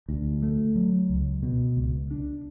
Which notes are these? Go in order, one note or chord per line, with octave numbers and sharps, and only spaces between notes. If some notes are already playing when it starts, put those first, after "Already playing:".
D2
A3
F#3
C#2
B2
C#2
D4